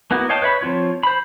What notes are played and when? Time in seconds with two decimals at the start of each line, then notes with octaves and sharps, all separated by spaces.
0.11 A#3 B3 E4 F#4
0.29 C#5 D#5 F5 G5 A5
0.42 B4 C#5 E5 B5
0.61 F3 C4 F4 C#5
1.03 C5 B5